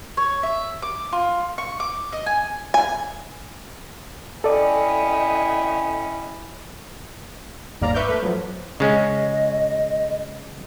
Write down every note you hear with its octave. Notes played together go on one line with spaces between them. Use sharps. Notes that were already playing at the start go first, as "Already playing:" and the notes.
C#5
E5
D6
F4
C#6
D6
D#5
G#5
G#5
C#4 E4 A4 D5 D#5 G5
G1 D#2 G#2 D5 F5 A#5
B4 E5 C#6 D6 F6 G6
A3 B4
F3 F#3
C#3 G#3 C#4 D#5